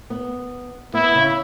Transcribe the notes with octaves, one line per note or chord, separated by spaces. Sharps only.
B3
B3 E4
C#3